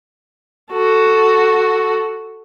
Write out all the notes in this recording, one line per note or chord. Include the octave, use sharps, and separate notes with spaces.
F#4 A4